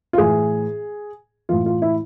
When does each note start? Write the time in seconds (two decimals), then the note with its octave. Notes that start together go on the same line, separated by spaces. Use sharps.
0.13 F4
0.18 A2 E3 G#4
1.49 A2 E3 F4
1.66 F4
1.82 E4